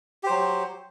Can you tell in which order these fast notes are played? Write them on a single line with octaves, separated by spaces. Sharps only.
G4 C5 F#3